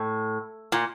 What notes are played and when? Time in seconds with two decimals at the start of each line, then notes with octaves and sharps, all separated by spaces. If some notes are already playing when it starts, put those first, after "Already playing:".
Already playing: A2
0.72 A#2